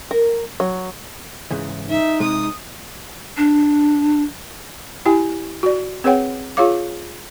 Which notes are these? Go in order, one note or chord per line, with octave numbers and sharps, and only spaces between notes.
A#4
F#3
G#2 C#3 E3
D#4 E5
C3 G#3 D#6
D4
E4 G4 G5 G#5
F#4 D5
C4 G#4 B4 C#5 F#5 G5
F4 G#4 C#5 F5 D6